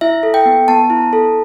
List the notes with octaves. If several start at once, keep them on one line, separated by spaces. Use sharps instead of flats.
E4 E5
A4
G5
B3
B3 A5
E4
A4